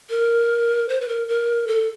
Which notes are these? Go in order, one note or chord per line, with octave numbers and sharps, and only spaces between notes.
A#4
C5
B4
A#4
A#4
A4